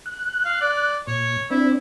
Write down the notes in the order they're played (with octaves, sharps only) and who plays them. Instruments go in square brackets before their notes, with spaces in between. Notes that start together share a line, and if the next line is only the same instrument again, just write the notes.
[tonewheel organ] F#6
[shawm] F5
D5
[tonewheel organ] A#2 [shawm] C#5
[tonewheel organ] C4 D4 [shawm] E4